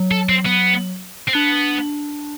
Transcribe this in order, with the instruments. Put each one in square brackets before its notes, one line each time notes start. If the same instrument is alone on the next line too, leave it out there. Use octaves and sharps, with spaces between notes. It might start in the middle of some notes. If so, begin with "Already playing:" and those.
Already playing: [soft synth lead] F#3
[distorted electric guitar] A4
C4
B3
C4
[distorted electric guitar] B3 [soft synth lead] D4